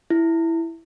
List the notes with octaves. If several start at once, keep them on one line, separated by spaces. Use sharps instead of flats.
E4